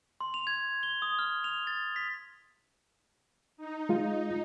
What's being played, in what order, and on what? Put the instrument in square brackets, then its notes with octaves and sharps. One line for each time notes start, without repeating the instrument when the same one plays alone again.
[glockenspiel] C6
F7
G#6
G7
D#6
F6
F7
A6
B6
[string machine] D#4
[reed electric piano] G#3 F4